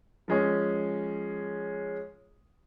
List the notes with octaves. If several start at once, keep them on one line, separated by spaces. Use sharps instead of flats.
F3 G#3 C#4